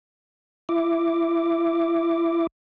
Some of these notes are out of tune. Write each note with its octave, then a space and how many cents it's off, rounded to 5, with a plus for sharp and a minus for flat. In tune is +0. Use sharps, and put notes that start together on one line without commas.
E4 +30 E5 +10 D6 +0